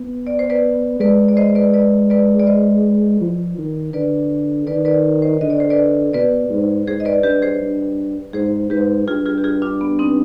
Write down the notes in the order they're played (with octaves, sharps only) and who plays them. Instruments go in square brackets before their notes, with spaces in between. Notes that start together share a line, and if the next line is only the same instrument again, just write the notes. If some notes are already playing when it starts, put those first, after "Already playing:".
Already playing: [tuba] B3
[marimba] D5
C5
B4 D5
[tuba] G#3 [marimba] B4 D5
[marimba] D5
C5 D#5
B4 D5
B4 D5
B4 D5
D5
C5 D#5
[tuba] F3
D#3
[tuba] D3 [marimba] B4 D5
[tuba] D#3 [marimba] B4 D5
[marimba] B4 D5
C5 D#5
[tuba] D3 [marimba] D#5
[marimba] D5
C5
B4 D5
[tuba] B2 [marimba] B4 D5
[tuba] G#2
[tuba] G#2 [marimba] G#4 C5
[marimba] D#5
B4 D5
[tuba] G2 [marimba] G4 B4
[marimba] G#4 C5
[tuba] G2
[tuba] G#2 [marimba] G#4 C5
[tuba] G#2 [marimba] G4 B4
[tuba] G2 [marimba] F4 G#4
[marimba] F4 G#4
G4
F4 G#4
D4 F4
B3
C4 D#4